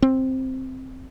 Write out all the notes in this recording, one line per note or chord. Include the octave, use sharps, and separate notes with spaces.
C4